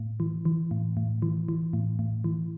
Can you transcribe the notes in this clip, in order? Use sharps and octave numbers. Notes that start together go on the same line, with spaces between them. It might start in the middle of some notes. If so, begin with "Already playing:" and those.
Already playing: A2
E3
E3
A2
A2
E3
E3
A2
A2
E3